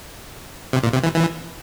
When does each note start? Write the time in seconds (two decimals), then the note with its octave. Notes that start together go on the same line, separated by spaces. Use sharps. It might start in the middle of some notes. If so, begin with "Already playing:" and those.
0.73 C3
0.84 A#2
0.93 C3
1.03 E3
1.14 E3